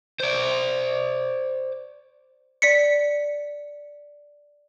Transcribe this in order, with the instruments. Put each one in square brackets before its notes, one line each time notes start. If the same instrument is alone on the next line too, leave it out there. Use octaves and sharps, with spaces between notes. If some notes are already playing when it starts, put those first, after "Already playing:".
[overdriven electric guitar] C5 D5
[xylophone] D5 B6 C#7